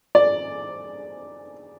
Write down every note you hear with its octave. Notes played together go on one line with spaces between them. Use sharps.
D5